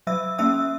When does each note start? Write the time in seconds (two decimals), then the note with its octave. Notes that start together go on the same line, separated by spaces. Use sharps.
0.07 F#3 E5 E6
0.39 A#3 C#4 E5 E6